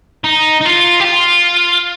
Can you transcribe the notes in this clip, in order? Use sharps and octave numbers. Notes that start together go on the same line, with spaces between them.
D#4
D#4
F4
G4
F4